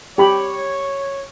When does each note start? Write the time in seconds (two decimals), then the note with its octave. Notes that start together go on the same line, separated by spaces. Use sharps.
0.18 G4 C#5 B5